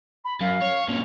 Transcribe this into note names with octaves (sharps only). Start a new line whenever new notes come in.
B5
F#2 F5
C#5
A#2 C#3 F7